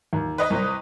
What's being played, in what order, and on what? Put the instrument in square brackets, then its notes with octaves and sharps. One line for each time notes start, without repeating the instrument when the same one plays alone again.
[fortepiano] D#2
[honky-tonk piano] B4 D#5
[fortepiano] C2